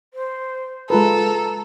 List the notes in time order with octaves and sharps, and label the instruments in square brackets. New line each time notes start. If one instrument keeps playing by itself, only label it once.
[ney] C5
[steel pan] G#3 F4 B4 [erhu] A4 [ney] A#5